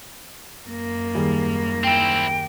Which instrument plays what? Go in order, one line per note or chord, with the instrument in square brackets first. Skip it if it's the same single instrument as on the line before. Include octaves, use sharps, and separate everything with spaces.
[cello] F#2 A#3
[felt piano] D#2 G3 G#4
[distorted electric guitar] C4 E4 [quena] G5